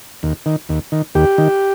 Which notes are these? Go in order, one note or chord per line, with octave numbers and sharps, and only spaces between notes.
D#2
D#3
D#2
D#3
D#2 G4
D#3